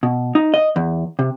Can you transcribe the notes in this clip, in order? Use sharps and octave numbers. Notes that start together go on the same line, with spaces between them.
B2
D#4
D#5
E2
C3